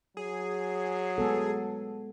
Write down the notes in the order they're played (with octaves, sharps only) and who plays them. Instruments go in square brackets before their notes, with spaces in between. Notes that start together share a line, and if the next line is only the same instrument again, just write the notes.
[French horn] F#3 [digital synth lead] G#4
[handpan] G#3 B3 A4